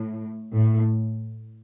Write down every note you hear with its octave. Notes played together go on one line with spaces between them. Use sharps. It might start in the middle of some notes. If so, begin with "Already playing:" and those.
Already playing: A2
A2